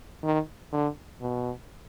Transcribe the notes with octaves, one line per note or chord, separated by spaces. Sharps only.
D#3
D3
B2